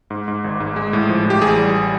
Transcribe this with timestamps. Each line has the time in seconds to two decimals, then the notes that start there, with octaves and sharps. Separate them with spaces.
0.10 G#2
0.28 G#2
0.44 G#1
0.60 G#2
0.76 G#3
0.93 A2
1.09 F3
1.25 A2 G4
1.42 A1 G#4
1.58 G3